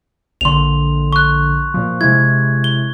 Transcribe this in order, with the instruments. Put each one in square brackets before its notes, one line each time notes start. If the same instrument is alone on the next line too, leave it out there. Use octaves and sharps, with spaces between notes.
[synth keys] A#1 D3 [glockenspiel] C6 F7
[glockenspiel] C#6 F#6
[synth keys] A#2 F3
[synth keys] C3 G#3 E4 [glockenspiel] G#6
[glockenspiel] G7